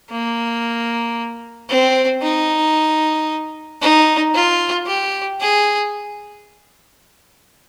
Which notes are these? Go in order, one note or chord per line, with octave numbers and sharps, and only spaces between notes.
A#3
C4
D#4
D#4
F4
G4
G#4